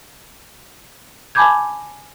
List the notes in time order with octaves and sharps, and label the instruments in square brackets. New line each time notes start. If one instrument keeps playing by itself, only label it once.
[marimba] G#5 A5 B5 D6 G6 G#6